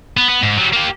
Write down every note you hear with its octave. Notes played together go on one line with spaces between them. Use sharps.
B3
B3
G#2
F#3 G3
A#3 G4